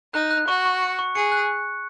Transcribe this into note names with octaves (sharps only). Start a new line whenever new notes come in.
D#4 F#6
F#6
F#4 C#6
C#6
C#7
C#6
G#4 C#7
F#6